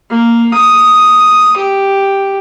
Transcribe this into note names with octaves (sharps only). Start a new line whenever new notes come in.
A#3
D#6
G4